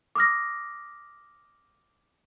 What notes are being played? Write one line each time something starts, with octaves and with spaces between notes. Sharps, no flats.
D6 D#6 F6 A#6